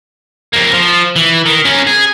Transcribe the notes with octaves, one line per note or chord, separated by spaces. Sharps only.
F2 A#3
F3
E3
D#3
C#4 A#4
G#4